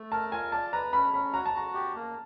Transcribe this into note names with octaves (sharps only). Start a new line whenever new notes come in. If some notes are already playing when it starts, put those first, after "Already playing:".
Already playing: A3
A#4 A5
F4 G#5
D5 A5
B4 A#5
C#4 B5
C#4 B5
F#4 A#5
A5
F#4 A#5
G4
A#3